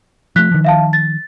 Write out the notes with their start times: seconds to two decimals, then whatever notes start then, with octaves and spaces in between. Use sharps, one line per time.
0.36 F3 A3 F#6 B6
0.51 D#3 F3
0.64 E5 F5 A5
0.93 A6